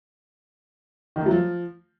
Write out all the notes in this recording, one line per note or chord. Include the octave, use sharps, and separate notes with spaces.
D#3
A3
F#3
F3